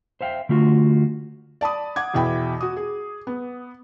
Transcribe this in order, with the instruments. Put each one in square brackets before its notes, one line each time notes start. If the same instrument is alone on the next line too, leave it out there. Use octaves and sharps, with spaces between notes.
[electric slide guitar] C5 E5 F5 G5
D3 A3 F4 F#4
[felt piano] D5 A5 B5 D#6
F#5 D6 G#6
E2 B2 E4 G5 B5
F#4 D#6
G#4
B3